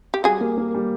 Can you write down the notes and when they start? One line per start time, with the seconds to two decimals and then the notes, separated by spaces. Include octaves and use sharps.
0.14 G4
0.24 G3 F#4 G#4
0.41 A#3
0.58 A#3
0.74 G3